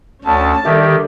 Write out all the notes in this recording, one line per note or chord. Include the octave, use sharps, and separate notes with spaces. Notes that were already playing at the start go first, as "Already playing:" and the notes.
D2 C#4 A5
D3 D#3 G3 G4 E5